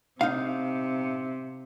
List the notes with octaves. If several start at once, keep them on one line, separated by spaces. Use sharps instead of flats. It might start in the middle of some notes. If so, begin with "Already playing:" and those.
C3 D#4 F5